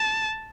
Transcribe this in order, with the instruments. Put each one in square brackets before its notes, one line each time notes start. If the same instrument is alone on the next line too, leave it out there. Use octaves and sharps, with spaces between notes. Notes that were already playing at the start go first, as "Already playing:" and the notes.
Already playing: [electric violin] A5